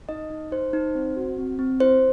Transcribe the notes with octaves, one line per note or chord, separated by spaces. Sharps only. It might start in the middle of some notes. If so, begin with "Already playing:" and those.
D#4 D#5
D#4
D#4 C5
D#4
C4
F#4
C4
C4
E4 C5